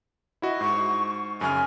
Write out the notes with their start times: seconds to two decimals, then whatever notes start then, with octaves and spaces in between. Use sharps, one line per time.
0.42 E4 F#4 D#5
0.61 G#2 C#6
1.41 F#2 C#3 G#5 F6